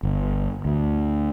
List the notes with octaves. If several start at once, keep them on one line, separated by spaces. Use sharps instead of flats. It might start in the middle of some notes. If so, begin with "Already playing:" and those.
G1
D2